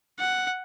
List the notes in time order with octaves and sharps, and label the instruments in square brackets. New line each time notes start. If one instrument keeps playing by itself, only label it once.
[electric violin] F#5